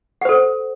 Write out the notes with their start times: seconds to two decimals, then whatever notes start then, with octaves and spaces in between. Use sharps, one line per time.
0.22 F#5
0.25 C5
0.29 A4